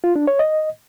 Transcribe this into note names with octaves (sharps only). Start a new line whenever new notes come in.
F4
D4
C#5
D#5